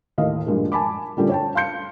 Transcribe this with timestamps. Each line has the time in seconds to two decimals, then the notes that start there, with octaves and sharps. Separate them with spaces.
0.18 D#2 A2 D#5 F5
0.46 G2 A#2 F3 G#3
0.72 G#5 A5 B5 D6
1.17 A#2 D3 G3 A3 C#4 F4
1.29 C#5 G5 A5
1.55 F5 C6 G6 C#7